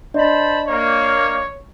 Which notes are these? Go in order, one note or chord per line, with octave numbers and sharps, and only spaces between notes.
D4 C5 D5 D#5 A5 B5
A#3 C#5